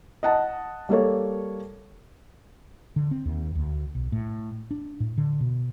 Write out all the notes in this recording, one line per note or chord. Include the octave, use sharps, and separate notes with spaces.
D#5 F#5 A5
G3 A#3 A4 C#5
D3
C4
D#2
D2
B1
A2
D4
A2
D3
B2